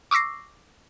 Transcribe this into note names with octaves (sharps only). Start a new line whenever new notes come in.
C#6 D6 E6 A#6 C7